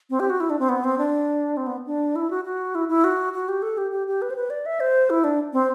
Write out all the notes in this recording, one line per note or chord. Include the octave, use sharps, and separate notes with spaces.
C4
G4
F#4
E4
D4
C4
B3
C4
D4
C4
B3
D4
E4
F#4
F#4
E4
E4
F#4
F#4
G4
A4
G4
G4
G4
B4
C5
B4
D5
E5
C5
E4
D4
C4